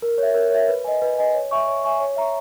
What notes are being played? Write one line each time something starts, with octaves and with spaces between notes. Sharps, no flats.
A#4
C#5 E5
A#4
C#5 E5
B4
D#5 G#5
B4
D#5 G#5
C#5
E5 G#5 C#6
C#5
E5 G#5 C#6
C#5
E5 A#5 C#6